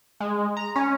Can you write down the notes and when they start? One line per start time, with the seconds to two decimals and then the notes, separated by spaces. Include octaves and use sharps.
0.20 G#3
0.57 A#5
0.76 C#4